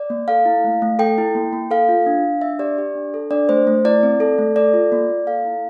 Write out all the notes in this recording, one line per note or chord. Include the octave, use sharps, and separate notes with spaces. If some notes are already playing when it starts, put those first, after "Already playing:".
Already playing: D5
A#3
A4 F5
E4
A3
A3
A4 G5
E4
A#3
A#3
A4 F5
F4
D4
D4
D4 E5
G4 D5
G4
D4
A4
D4 D5
A3 C5
A3
E4 D5
C4
A4
A3
A4 D5
F4
A#3
A#3
A4 F5
E4